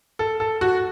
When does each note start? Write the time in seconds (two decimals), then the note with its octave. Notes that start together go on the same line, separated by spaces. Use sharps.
0.19 A4
0.40 A4
0.61 F#4